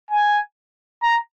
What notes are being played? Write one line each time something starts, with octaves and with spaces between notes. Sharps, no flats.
G#5
A#5